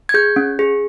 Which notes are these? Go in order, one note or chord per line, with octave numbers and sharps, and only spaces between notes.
G#6
G#4 G6
C#4
G#4